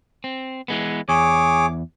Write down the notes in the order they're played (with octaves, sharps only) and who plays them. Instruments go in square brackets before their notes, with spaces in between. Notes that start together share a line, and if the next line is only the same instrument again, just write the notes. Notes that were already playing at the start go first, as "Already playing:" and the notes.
[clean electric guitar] C4
E3 G#3 B3
[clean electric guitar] E2 [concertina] G#4 C#5 D6